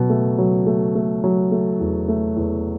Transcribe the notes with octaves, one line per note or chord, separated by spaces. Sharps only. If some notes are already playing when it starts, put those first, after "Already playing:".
Already playing: B2 F#3
A3
F#3
A3
A3
F#3
A3
E2
A3
E2